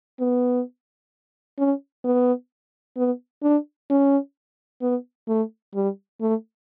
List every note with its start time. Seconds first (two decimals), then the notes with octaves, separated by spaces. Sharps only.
0.20 B3
1.58 C#4
2.05 B3
2.97 B3
3.43 D4
3.90 C#4
4.82 B3
5.28 A3
5.75 G3
6.21 A3